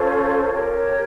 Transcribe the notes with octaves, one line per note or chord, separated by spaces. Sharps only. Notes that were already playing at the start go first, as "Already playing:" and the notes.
Already playing: C#4 F4 A4 C5
G4 A#4 C#5